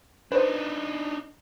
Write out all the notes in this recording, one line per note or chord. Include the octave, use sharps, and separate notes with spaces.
D4 D#4 B4 C5